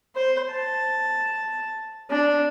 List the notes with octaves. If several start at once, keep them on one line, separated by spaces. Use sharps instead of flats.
C5
A5
D4